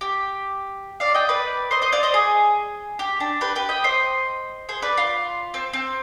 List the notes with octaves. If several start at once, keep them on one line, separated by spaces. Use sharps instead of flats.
G4
D5 F5
D#5 G5
B4 D5
C5 D#5
C5 D#5
D5 F5
C5 D#5
G#4
G4
D4
G4 B4
G4 B4
D#5 G5
C5 D#5
G#4 C5
B4 D5
F4
C4
C4